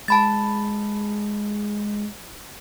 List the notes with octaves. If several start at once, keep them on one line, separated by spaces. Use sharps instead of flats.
G#3 A5 B5 A6